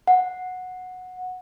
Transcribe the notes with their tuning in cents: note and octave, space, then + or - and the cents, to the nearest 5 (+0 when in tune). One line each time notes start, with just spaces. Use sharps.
F#5 -10